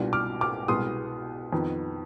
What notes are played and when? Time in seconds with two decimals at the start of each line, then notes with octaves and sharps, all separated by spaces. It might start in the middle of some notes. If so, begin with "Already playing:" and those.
Already playing: C2 B2 G3 D4 F4
0.13 D6 F6
0.41 D6 F6
0.68 C2 B2 G#3 B3 C6 D#6
1.53 F2 D#3 B3